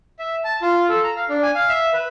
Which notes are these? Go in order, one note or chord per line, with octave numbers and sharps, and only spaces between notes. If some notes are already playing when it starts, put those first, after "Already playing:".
E5
A5
F4
A4
A#5
F5
D4
G#5
F5
E5
B4